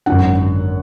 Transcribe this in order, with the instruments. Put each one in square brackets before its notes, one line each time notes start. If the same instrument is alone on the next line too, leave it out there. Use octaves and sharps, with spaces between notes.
[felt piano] G#1 F#2 D3 F#5